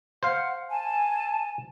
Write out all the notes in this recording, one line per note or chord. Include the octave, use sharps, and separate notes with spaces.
C5 F5 F#5
G#5 A5